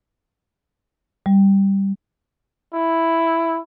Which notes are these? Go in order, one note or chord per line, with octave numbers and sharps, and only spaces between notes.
G3
E4